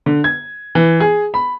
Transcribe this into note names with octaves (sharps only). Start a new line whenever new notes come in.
D3
G#6
E3
G#4
B5